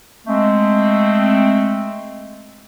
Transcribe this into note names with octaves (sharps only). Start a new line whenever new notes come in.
G#3 A3 C4